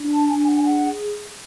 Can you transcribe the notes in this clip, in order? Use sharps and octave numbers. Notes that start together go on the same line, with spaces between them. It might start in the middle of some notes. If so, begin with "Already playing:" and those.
Already playing: D4
A5
D4 G#5
F#5
G#5
G#4 F#5